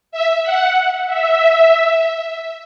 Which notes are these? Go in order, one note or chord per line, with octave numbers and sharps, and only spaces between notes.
E5
F#5
E5